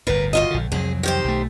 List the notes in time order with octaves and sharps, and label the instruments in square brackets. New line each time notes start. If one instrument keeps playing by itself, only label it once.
[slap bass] G1 D2 A2 [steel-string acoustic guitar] A#4 B4
[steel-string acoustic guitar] F#2 F4 D#5
[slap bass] A#1 D3
[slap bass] C2 F2 F#3 [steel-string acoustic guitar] G#4
[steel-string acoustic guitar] D#3 G4 C5
[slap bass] B1 A3